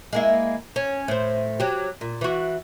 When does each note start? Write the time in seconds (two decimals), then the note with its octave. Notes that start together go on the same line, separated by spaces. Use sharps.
0.13 G#3 A#3 E4
0.76 C#4
1.08 A2 C5
1.60 F#3 G4
2.01 A#2
2.21 E3 F#4